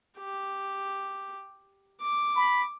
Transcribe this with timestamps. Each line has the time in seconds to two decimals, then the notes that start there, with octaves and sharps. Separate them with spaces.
0.18 G4
2.01 D6
2.36 B5